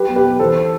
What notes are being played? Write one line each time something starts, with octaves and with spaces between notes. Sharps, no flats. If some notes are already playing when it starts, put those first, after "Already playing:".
Already playing: G3 G4 B4
B1
G4 B4
B1
E3 A4 C5